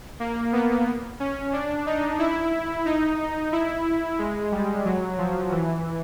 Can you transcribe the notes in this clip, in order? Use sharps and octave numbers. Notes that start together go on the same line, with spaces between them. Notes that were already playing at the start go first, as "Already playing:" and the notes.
A#3
B3
C#4
D4
D#4
E4
D#4
E4
G#3
G3
F#3
F3
E3